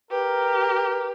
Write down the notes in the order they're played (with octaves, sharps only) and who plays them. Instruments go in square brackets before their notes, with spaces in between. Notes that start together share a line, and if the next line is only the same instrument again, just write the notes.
[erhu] G4 [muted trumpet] A#4 [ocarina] B4